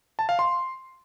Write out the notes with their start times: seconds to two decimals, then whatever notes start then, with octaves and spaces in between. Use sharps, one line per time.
0.19 A5
0.29 F5
0.39 C6